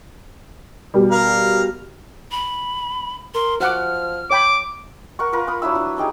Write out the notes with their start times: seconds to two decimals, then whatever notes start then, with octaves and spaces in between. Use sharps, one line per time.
0.94 B2 G3
1.11 A#4 F5
2.31 B5
3.34 A#4 C6
3.60 F3 F#4 F#5 D6 F6
4.31 C#5 G5 B5 D6
5.19 A#4 F#5 C#6
5.33 F4 A#4 B4
5.47 B5 D#6
5.62 F#3 D4 E4 E6
5.75 D4
5.97 D4 D#4 G4 G#4